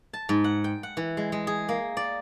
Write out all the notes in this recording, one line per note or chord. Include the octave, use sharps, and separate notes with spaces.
A5
G#2
F#5
G5
F#5
E3
G#3
G#3
G#4
A#3
D5